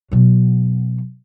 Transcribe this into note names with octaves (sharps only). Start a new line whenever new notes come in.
B2 F#3